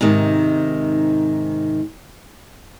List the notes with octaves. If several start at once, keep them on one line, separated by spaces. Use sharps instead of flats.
G#2 C3 D#3